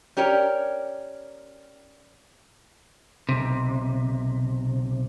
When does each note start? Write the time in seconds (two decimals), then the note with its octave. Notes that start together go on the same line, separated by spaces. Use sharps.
0.17 C#4 G4 A#4 C#5 D5
3.29 B1 C3